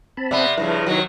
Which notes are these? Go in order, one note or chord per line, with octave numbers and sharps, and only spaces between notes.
C4 A5 B5
C3 B3 D5 E5
G2 C#3 F3 E4 B4 A#5
C3 D#3 F#3